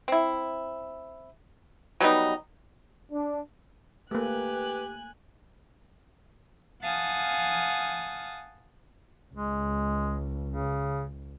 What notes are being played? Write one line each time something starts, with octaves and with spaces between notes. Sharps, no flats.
C4 E4
F#3 G3 B3 D#4
D4
A3 A#3 G4 B4 G#5 F#6
F5 F#5 G#5 A5 D#6 F6
C#2 G#3
C#3